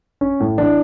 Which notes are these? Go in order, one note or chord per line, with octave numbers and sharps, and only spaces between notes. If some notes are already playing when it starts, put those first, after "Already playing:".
C#4
A2
E3 D4